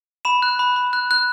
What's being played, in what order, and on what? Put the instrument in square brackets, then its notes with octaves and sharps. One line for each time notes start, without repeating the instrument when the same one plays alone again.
[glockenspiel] B5 E7
F#6
B5
B5
F#6
F#6